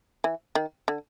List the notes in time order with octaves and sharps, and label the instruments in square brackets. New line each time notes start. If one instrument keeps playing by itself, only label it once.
[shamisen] E3
D#3
D3